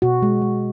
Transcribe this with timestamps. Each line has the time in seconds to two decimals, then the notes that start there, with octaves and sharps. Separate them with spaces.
0.02 B2 F#4
0.22 G#3
0.42 G#3